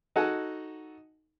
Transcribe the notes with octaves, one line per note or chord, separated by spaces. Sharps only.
D#4 F#4 A4 F#5 G#5 A5